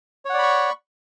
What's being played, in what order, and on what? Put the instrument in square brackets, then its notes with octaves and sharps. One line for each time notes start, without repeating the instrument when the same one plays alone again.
[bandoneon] C#5
F#5
D5
B5
C#6